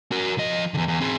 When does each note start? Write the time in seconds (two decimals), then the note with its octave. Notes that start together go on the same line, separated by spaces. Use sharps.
0.12 F#4 A#4
0.38 F3 D#5
0.74 E2 D3
0.88 E2
1.01 C4 G#4